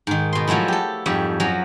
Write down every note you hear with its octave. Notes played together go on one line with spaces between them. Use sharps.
G#2 D#3
B2 C6
F3 F#3 G#3 A3 E4
G4 A4
F2 G#2 G3 C#5 E5
F#2 F3 F#3 C#4 A#5